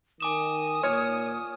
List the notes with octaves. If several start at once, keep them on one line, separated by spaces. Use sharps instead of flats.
D#3 G#5 D6 D#6 E7
A#2 C#5 F6